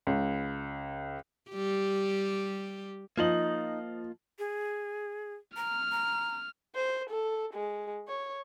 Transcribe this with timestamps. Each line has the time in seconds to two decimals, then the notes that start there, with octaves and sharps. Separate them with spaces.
0.07 C#2
1.50 G3 G4
3.18 F3 A#3 D#4 F4 D#5 F#7
4.39 G#4
5.57 A#5 F6
5.92 A#5
6.75 C5
7.10 A4
7.54 G#3
8.08 C#5